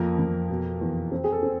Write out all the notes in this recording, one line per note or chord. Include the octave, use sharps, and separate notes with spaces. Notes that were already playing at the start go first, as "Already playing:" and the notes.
Already playing: F2 F3 A#3 A#4
F2
B2
E2
C4
G#4
A4
C4